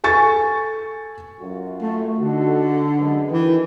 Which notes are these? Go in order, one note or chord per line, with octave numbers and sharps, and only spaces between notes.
A4 G#5 C#6 A6
F#2 F4 F#4
A3
D3 D#4 F#4 A4
F#2 G#3 B4
D#3 E3 G5